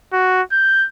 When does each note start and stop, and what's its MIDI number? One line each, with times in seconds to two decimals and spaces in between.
0.13 0.42 66
0.52 0.87 91